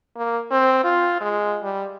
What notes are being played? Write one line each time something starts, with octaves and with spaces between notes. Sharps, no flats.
A#3
C4
F4
G#3
G3